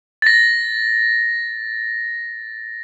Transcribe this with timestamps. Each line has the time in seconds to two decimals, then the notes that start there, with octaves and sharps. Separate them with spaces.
0.22 A6 A#6